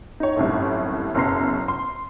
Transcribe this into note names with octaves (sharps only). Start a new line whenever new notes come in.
D#4 C#5
G1 C2 F#2 A2
F#1 F#2 B2 A#5 C6 C7
C6